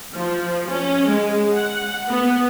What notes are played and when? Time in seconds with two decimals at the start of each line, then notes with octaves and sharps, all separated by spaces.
0.13 F3
0.68 C#4
1.06 G#3
1.56 F#5
2.09 B3